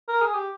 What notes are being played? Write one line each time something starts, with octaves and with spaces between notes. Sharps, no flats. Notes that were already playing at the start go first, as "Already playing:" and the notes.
A#4
G#4
G4